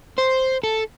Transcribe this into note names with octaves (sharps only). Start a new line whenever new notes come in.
C5
A4